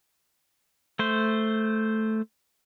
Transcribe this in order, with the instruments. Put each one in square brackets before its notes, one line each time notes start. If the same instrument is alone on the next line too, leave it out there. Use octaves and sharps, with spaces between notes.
[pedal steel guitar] A3 C5